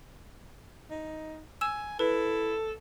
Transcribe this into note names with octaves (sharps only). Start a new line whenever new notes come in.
D#4
G#5 E6 E7
E4 A4 B4